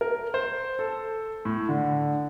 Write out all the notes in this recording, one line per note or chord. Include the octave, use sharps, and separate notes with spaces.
A#4
C5
A4
A2
D3